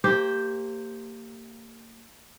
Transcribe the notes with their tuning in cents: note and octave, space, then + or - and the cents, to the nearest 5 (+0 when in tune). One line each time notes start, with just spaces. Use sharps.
A#3 -30 G4 +0 C5 +0